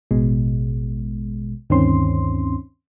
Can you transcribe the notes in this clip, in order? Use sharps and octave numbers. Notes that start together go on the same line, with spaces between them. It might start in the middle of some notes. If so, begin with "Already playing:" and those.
A1 B2 G#3
D2 G2 D#3 C4 C#4 C6